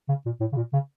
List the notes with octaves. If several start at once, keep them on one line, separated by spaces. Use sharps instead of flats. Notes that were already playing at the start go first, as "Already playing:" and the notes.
C#3
A#2
A2
C#3
A#2
C#3